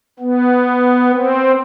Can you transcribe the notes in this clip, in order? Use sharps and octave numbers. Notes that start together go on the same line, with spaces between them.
B3
C4